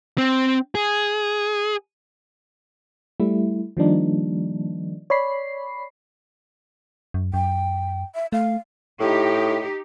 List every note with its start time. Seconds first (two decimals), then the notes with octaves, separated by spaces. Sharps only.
0.18 C4
0.75 G#4
3.20 G3 A3 E4
3.77 D#3 F3 G3 A#3 D4 D#4
5.10 C#5 D5 B5 C7
7.14 F#2
7.34 F#2 G5
8.15 E5
8.32 A3 F5
9.00 A2 D#4 G4